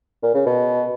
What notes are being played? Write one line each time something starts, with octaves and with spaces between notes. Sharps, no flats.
A#2
C#3
B2